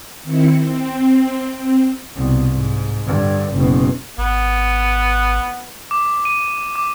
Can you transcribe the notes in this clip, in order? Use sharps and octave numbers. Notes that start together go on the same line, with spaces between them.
D#3 C4 E4 C#7
C4
C4
C2 B2
G#2
G2 D3
F#1 B2
G#1 B3
D6
D#7
D6